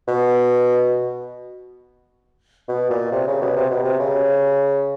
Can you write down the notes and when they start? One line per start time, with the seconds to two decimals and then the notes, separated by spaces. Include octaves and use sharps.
0.08 B2
2.69 B2
2.91 A#2
3.12 C3
3.27 C#3
3.41 B2
3.56 C3
3.71 B2
3.84 C3
4.00 C#3